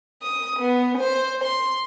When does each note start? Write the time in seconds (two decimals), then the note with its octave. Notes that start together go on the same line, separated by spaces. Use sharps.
0.23 D#6
0.60 B3
0.98 C5
1.44 C6